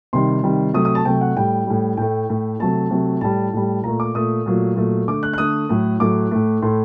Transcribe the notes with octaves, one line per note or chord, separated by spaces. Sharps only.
C3 D#3 G3 C6
C3 D#3 G3
C3 F#3 A3 D#6
D#6
A5
C3 F#3 A3 G5
F#5
A2 G3 G5
A2 G3
A2 A3 G5
A2 A3
C3 F#3 A3 A5
C3 F#3 A3
A2 G3 A5
A2 G3
A#2 A3 A#5
D6
A#2 A3 D#6
A#2 F#3 A3
A#2 F#3 A3
D3 A3 D6
F#6
F#6
D3 A3 D#6
A2 F#3 A3
A2 F#3 A3 D6
A2 A3
A2 A3 C6